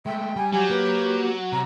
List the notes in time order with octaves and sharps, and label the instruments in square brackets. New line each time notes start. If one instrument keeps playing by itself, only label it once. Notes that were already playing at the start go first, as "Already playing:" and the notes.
[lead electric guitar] G#3 A3 [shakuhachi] E5 [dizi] G5
[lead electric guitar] G3 [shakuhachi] G#5
[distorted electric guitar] F#3 [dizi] G4 [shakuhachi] G#5
[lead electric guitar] A#3 [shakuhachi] B4
[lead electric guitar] C3 [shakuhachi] A#5